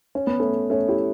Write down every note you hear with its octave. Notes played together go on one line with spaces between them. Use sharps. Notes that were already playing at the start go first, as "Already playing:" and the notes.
C#4
B3
A3 C#4
A3 C#4
E4 G4